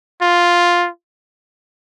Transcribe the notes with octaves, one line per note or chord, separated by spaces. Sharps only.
F4